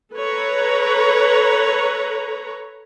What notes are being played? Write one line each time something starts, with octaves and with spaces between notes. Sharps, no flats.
A4 B4 C#5 A#5